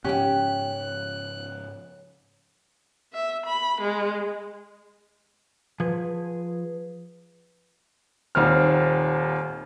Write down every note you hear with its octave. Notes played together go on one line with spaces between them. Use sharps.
G#2 C#3 F3 C#4 G4 G5 F#6
E5
B5
G#3
F3 G#4 B4
D#1 D#2 C4 F6